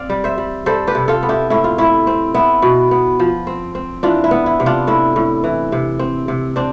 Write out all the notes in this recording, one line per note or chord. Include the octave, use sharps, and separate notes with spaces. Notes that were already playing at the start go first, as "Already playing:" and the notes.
Already playing: C4 D5 F5
G3
C5 E5
G3
G3 A4 C5
G4 B4
C3
F4 A4
B3
E4 G4
A2 E4
F4
A2 E4
C4
B3 E4
B2
B3
F3
C4
C4
E3 D4 F4
E4
B3
E4
C3
D4 F4
A2 E4
A2
E3
C3
C4
C3
C4 D4